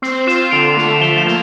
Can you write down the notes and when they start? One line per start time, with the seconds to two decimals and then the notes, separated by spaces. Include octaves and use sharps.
0.02 C4 C7
0.27 F4 C7 E7
0.51 D3 D7 F7
0.77 A3
1.01 F3 E7 G7
1.18 E7 G7
1.26 A#3